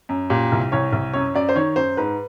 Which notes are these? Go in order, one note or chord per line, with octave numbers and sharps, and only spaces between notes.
F#2
A#2 G4
C2
C2 C#5
C2
F#2 C#5
F#2 D5
C5
D#3 C#5
F#2 C5
G#2 B4